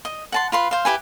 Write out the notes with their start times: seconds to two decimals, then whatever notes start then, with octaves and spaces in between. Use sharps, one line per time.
0.05 D#5
0.32 F#5 A5 C6
0.52 F4 B4 C6
0.71 C5 F5
0.85 E4 G4 B4 G#5